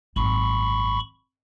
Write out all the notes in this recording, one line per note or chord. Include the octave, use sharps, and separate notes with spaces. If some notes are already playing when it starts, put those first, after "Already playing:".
G#1 F#2 B5 C#6